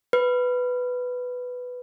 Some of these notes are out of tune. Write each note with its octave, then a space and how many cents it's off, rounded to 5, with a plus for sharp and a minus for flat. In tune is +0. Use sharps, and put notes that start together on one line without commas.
B4 +5